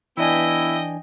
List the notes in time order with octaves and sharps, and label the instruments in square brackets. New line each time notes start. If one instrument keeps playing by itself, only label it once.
[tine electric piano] E3 D4 G#5 [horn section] B3 E4 [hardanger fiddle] D#5 G5